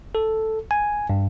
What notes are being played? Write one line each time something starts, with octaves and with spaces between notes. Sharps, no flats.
A4
G#5
G2